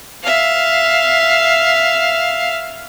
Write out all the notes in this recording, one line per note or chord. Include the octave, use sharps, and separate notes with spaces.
E5 F5